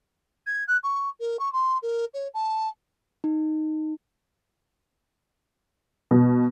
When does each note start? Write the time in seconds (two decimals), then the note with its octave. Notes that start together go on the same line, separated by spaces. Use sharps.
0.46 G#6
0.68 F#6
0.83 C#6
1.20 A#4
1.39 C#6
1.53 C6
1.82 A#4
2.14 C#5
2.34 A5
3.24 D#4
6.11 B2